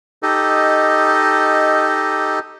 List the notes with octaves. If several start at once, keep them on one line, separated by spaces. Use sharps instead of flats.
D#4 G4 A4 D#5